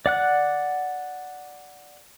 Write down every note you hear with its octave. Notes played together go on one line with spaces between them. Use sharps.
D5 F#5 F#6